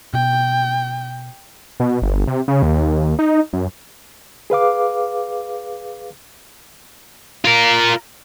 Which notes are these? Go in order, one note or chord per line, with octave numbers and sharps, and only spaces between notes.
B2 G5
B2
G1
C3
C#3
D#2
D#4
F#2
G#4 B4 F5 D6
F4 A#4